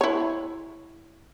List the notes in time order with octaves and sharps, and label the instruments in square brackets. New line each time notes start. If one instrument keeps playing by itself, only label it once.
[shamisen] E4 C#5